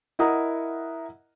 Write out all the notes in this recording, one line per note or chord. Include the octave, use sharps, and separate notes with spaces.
E4 A#4 D#5 F#5 A#5 D#6